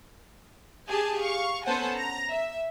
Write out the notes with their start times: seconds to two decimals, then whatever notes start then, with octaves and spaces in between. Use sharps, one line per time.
0.88 G4 G#4 G#5 A5
1.20 F5 C#6
1.65 B3 C#4 A4 C5 F#5 G#5
1.95 A#5
2.31 E5